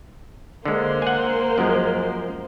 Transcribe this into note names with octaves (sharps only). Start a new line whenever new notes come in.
D3 G#3 A#3 C5
F#5 G#5
F#2 F3 G#3